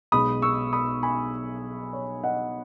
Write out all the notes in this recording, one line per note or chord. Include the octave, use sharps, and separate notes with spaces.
B1 B2 G#3 B5 D#6
C#6 E6
B5 D#6
G#5 B5
C#5
D#5 F#5